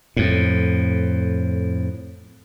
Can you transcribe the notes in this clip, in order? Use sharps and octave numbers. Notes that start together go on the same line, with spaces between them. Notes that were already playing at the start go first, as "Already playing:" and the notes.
F2 A2